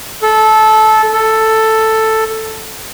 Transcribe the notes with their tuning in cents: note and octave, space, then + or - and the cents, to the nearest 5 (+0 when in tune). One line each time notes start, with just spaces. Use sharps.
A4 -15
A4 +5